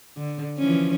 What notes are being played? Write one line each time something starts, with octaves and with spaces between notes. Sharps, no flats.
D3
E3 F3 C#4